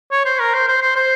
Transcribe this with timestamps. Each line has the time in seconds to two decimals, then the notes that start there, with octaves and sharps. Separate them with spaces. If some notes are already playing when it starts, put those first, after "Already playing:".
0.11 C#5
0.25 C5
0.40 A#4
0.54 C5
0.68 C5
0.82 C5
0.96 C5